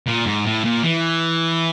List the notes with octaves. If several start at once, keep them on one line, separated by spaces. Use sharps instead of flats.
A#2
G#2
A2
A#2
E3